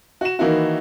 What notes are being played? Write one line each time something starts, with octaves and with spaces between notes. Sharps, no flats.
F#4 E7
D#3 E3 A#3 D#4 E4 F#4